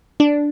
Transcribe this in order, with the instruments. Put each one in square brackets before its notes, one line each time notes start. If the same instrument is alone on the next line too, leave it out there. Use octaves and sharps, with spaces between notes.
[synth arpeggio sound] D4